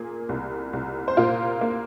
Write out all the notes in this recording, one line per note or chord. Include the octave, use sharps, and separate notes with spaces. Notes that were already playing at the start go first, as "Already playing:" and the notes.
Already playing: A#2 A#3 G#4
C2
C2
C5
A#2 F4 A#4
A#3